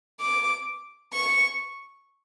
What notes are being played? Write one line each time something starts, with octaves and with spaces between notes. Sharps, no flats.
D6
C#6